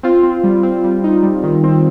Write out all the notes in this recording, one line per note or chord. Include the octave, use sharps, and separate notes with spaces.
C4 F4
C4
G3
C4
G3
D#4
G3
D#3
C4